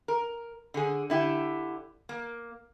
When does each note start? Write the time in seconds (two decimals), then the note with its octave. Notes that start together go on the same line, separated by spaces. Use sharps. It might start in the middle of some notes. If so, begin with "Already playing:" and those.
0.08 A#4
0.74 D3 G#4
1.10 D3 E4 G4
2.09 A#3